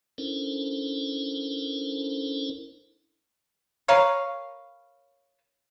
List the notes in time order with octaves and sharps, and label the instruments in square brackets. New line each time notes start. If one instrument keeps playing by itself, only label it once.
[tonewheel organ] C#4 D4 E4 A4 A#4 C5
[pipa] A#4 B4 C#5 F5